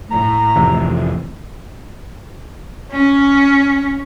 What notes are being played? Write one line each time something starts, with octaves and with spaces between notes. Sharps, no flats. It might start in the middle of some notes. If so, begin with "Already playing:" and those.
A2 A#5
F2 C3 E3
C#4